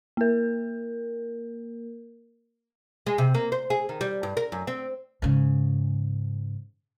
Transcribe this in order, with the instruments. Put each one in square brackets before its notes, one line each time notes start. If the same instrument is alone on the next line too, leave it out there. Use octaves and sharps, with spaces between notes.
[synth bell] A#3 A#4
[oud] G#3
C3
A#3
C5
G#4
D#3
G3
G2
A#4
F#2
C4
[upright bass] G#2 C#3